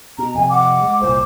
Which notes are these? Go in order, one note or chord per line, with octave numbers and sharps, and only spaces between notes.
B2 A#5
F2 C3 G#5
F#5 D6
G#3
F#1 C2 A#2 C5